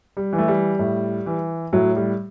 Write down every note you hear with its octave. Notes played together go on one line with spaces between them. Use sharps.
G3
E3
A3
G3
A2
E3
A2 F#3
G3